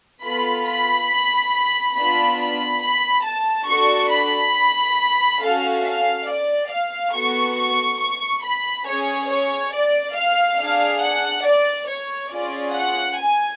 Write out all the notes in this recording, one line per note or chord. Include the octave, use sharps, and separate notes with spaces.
B3 F4 A4 B5
B5
B3 D4 F4 B5
B5
B5
A5
D4 F#4 A4 C#6
B5
C#4 F#4 A4 F5
F5
D5
F5
B3 F#4 A4 C#6
C#6
C#6
B5
C#4 G#4 C#5
C#5
D5
F5
D4 G#4 F5
F#5
D5
C#5
C#4 F4 G#4 D5
F#5
G#5